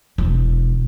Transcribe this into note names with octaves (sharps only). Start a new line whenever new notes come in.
E1